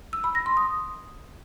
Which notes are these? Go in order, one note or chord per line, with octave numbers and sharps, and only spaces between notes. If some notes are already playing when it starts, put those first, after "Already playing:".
E6
B5
A#6
C6
D#6